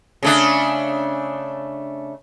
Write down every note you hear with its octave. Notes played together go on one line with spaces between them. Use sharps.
C#3 A3 D4